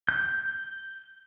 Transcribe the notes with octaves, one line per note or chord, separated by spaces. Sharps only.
G6